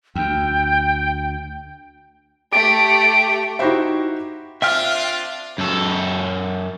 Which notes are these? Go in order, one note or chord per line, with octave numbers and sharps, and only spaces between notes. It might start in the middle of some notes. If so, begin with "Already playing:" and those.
D2 G5
A3 G4 D7
D#4 E4 F#4 G4 C5 E5
C4 D4 F4 E5 G5 F6
F#2 A4